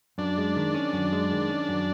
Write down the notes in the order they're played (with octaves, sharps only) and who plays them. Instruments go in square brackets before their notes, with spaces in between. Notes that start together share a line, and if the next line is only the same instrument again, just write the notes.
[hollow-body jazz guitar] F#2 [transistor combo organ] D4
[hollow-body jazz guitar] G#3
D#3
C#4
F#2
G#3
D#3
C#4
F#2